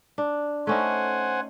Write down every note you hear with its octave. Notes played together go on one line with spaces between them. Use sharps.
D4
A3 C#4 D#4 C5 F#5 G#5